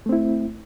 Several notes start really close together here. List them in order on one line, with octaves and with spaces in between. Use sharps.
A3 C4 E4